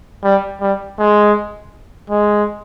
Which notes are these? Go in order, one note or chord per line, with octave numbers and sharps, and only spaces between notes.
G3
G3
G#3
G#3